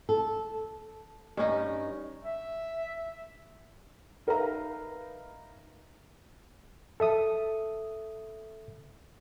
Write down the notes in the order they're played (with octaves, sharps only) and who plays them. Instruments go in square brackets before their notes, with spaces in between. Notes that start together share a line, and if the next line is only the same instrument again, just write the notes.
[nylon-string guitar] A4
[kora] G2 C#4 D#4
[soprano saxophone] E5
[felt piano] D#4 A#4 B4 E5 F5 A#5
[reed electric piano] A4 E5 D#6